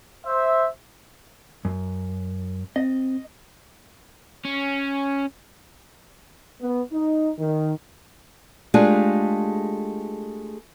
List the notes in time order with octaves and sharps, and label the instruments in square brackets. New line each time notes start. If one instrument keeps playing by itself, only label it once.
[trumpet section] C5 E5
[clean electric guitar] F#2
[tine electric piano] C4 [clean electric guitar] D#5
[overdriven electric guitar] C#4
[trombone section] B3
D#4
D#3
[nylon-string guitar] G#3 A3 D4 F4 G4 G#4